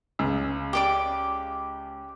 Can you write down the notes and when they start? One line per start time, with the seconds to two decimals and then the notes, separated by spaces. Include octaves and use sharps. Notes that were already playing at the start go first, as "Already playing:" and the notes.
0.19 C#2 C#3
0.73 G4 D5 D6